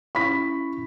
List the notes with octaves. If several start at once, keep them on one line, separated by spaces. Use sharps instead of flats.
C#4 E4 B5 C#6 B6